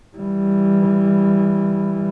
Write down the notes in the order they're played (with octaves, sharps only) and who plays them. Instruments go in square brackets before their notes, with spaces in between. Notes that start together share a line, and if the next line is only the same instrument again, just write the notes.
[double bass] E3 G3